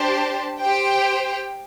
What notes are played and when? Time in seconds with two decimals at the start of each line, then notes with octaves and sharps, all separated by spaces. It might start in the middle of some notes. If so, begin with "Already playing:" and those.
Already playing: D4 G4 C5 A5
0.59 G4 C5 G5